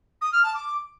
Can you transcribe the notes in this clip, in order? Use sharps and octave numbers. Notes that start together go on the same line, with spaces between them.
D#6
F6
A5
D6